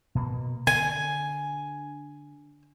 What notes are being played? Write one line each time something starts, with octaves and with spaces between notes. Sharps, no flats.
B2 A#3
D3 G#5